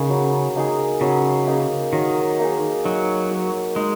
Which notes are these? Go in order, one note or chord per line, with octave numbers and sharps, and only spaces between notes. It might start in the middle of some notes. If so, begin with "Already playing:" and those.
Already playing: C#3 A#3 D#4 G#4
F#3
A#3 D#4 G#4
C#3 F#3
A#3 D#4 G#4
D#3 F#3
A#3 D#4 G#4
F#3 D#4
F#4 A#4
G#3 D#4